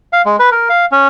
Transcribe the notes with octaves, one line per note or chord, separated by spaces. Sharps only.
F5
G#3
B4
A#4
F5
C#4